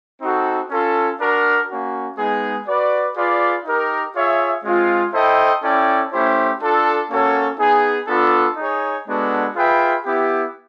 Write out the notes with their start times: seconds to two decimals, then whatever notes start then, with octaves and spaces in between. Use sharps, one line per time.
0.21 C4 D#4 F#4 A4
0.69 C#4 F4 A4
1.19 D4 F#4 A#4
1.68 A#3 C#4 F#4
2.17 G#3 B3 D#4 G#4
2.66 F#4 B4 D5
3.16 F4 G#4 B4 D5
3.64 D#4 G4 A#4
4.14 F4 G#4 C#5 E5
4.63 G#3 C4 F4
5.12 E4 A4 C5 D#5 G5
5.62 C#4 E4 A4 D5 G5
6.11 A3 C#4 E4 G4 C5
6.60 D4 F4 A4
7.09 A#3 C#4 F#4 A4 C#5
7.58 B3 D#4 G#4
8.07 B3 D4 F4 A4
8.56 D#4 G#4 C#5
9.06 G#3 B3 D4 F#4 A4
9.55 F4 G#4 B4 E5 G5
10.04 B3 E4 G4